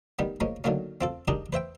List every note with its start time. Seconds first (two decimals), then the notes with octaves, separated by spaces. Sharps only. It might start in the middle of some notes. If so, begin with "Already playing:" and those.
0.19 D#3 G3 B3
0.40 F3 G#3 A#3 C#4
0.64 D3 D#3 F#3 A#3 C#4
1.01 C4 F4 A4
1.28 G#3 D4 D#4 G4 G#4 A#4
1.53 B4 C5 E5 G5